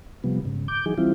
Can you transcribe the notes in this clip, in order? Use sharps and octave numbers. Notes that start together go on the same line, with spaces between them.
C3 F3 G3 B3
G#2 C#3
D6 G6
E3 F#3 D#4 G#4
E3 G3 C4 E4 F4